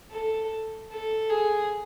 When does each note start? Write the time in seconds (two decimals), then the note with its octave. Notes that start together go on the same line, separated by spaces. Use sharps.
0.11 A4
0.91 A4
1.30 G#4